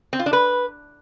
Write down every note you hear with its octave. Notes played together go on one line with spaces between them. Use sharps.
C4
F4
D4
B4